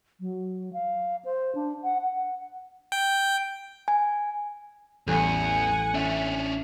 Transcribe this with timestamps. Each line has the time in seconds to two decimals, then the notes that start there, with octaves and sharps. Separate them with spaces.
0.20 F#3
0.73 F5
1.25 C5
1.55 D4
1.84 F#5
2.02 F#5
2.92 G5
3.88 G#5
5.07 A1 E2 G3 F#5 G#5 F#6
5.94 C#4 D4 E5